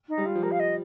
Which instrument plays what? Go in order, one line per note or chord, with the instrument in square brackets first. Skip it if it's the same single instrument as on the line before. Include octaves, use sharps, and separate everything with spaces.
[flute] D#4
[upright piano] G3
[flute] F4
[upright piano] F3
[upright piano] G3 [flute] A#4
[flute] F5
D#5